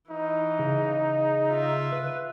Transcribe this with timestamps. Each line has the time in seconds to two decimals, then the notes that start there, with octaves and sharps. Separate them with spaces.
0.11 E3 D#4
0.59 C#3
1.48 F4 E5
1.92 B4